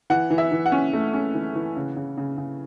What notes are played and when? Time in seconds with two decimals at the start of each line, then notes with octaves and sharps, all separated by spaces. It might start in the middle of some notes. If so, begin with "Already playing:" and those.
0.10 E3 F#5
0.30 E3
0.38 E5
0.52 E3
0.66 F#5
0.72 C#4
0.93 A3
1.13 C#4
1.34 E3
1.55 E3
1.76 C#3
1.96 C#3
2.17 C#3
2.37 C#3